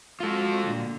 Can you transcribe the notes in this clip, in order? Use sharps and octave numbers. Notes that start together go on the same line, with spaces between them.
G#3 F4 F#4 A4
A#2 D3